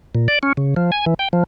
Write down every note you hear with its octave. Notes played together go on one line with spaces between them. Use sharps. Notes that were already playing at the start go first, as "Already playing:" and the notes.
A#2
D5
C#4
C#3
F3
G#5
E3
G5
F3